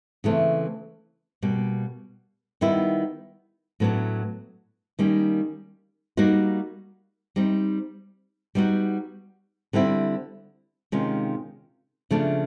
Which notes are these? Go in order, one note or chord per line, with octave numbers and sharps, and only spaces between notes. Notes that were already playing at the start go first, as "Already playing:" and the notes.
C#3 E3 A3 C4
B2 G3 A#3
D#3 G3 B3 E4
A2 F#3 B3 D4
D#3 G3 A#3 C#4
G3 A#3 D#4 F#4
G3 C4 D#4
G3 B3 D#4 F#4
D3 G3 C4 E4
C3 D#3 G#3 C#4 F4
C#3 F3 A3 D4